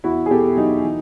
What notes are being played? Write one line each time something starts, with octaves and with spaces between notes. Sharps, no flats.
E2 E4 F#4
G#4
B2 G4 A4
F#3 D#4
E3